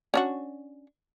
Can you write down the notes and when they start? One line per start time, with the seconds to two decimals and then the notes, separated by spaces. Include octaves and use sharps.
0.14 C#4 D4 F#4